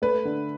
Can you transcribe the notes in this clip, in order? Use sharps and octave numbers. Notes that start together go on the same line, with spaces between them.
A3 B4
D3